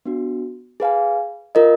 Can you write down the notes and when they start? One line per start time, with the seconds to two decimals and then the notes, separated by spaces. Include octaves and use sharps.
0.05 B3 D4 F#4
0.80 G#4 B4 F5 G#5
1.55 F4 A#4 D#5